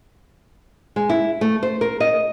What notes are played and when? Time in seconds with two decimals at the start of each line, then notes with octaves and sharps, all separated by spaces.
0.96 G#3
1.09 E4
1.41 A3
1.63 C5
1.81 A#4
2.00 D#5